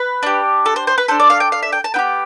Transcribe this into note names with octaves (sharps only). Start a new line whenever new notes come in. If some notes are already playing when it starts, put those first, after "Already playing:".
Already playing: B4
D4 G4
A4
C5
C5
B4
D4 A4 C5
D5
F5
G5
F5
E5
G5
A5
B3 E4 G4 G5